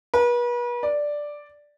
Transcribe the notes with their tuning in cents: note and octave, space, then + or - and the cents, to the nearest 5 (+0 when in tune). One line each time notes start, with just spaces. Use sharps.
B4 -40
D5 +0